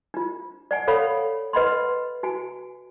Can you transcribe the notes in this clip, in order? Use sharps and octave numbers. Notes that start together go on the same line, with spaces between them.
D4 F4
D5 F#5 G#5
A4 C#5 F5 F#5 B5
B4 D#5 F#5 B5 C6
F#4 G#5